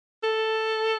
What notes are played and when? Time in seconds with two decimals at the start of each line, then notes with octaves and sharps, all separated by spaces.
0.23 A4